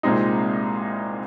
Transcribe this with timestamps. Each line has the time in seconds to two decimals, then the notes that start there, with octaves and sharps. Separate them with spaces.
0.03 C2 A#2 G#3 C4 D#4